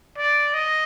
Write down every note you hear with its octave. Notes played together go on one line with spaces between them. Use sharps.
D5
D#5